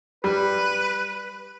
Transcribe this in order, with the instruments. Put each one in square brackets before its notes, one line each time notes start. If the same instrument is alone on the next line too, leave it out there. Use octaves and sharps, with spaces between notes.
[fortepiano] G3 [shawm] B4